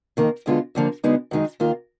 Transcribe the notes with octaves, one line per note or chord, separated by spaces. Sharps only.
F2 D#3 A#3
D2 D3 G#3 B3 F4
D#2 D3 F3 A#3
D2 D3 G#3 B3 D#4
F#2 D#3 G#3 D#4
D#2 D#3 A#3 F4